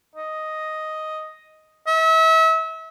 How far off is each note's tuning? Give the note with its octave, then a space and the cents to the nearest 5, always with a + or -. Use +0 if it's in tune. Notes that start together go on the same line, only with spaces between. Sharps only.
D#5 +5
E5 -35